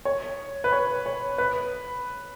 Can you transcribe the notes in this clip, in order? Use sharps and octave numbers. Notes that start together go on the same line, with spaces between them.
C#5
B4
C#5
C#5
B4